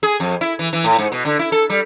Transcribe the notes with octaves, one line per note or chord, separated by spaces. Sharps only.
G#4
F2
E4
E3
E3
A2
G#2
B2
D3
E4
A4
G3